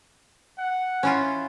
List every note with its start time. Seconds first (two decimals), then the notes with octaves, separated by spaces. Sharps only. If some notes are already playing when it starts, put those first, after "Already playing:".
0.59 F#5
1.03 C#4 E4 F4